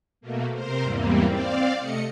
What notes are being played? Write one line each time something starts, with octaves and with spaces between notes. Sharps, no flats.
B2 A3 A#3
C3 A#4 C5
E2 G#2 E3 G3 A#3 C4
C4 D5 F5
C3 A3 D#5 C#7